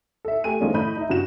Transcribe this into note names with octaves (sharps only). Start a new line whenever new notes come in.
A4 E5
A3 G4 G#5 D#7
D#3 F3 G#3 A3 C#4 D4
A2 D#5 B5 G6 D#7
D#4 E5
G2 C#3 F#4 E7